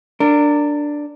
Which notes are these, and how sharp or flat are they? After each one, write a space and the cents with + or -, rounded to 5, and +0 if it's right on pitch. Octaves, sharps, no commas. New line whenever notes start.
D4 +0 A#4 -25